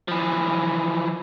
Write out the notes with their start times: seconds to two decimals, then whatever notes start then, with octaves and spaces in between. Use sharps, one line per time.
0.08 E3 F3